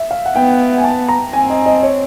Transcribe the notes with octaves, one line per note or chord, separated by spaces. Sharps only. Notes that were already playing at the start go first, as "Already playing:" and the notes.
Already playing: E5
F5
F#5
B3 G5
G#5
A5
A#5
C4 G#5
D#5
D#5
C#5